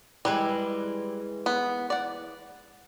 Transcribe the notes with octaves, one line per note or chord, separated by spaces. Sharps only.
E3 G3 G#3 B4
B3
D5 F#5